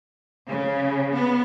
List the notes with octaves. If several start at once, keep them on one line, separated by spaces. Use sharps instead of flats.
C#3
B3